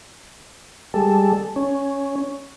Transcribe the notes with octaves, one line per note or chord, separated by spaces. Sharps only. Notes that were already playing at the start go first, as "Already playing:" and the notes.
G3 G#3 A4
C#4